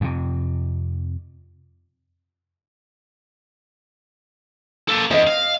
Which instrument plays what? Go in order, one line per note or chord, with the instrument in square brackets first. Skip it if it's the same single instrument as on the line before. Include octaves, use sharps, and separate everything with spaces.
[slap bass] F2 C3
[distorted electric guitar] A#3 A4
[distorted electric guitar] E2 [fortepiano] D#5
[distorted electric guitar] F5